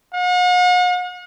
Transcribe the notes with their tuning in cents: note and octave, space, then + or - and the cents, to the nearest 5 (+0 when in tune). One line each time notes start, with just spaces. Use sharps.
F#5 -45